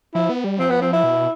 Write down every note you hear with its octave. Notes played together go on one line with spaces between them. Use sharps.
F3 E4
B3
G3
F3 C4
B3
C4
E4
B2